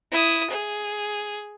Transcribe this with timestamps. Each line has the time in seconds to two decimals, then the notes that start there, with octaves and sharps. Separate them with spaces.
0.12 E4 D#6
0.50 G#4